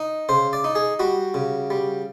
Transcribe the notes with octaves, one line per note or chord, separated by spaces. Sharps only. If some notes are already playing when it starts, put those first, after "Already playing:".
Already playing: D#4
C#3 C5
D5
D#4
G#4
G3 F#4
C#3
G3